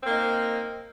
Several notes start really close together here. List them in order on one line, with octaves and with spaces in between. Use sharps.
C4 A#3 D#4